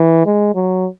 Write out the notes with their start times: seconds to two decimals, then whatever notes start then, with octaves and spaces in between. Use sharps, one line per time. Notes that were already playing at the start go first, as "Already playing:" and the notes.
Already playing: E3
0.26 G#3
0.55 F#3